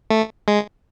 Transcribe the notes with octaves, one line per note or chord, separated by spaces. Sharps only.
A3
G#3